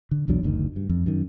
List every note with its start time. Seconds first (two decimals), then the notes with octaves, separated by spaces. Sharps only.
0.11 D3
0.28 B1 E2 F#3 D4
0.43 F#1 D2 B2 D#3
0.76 G2
0.89 F2
1.06 F#2 D#3